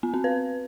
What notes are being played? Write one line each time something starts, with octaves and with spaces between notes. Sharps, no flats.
B3
C4
B4